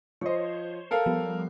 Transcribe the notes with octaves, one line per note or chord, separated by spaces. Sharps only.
F3 C5 C#5 D#5
A4 A#4 F5
F3 G3 B3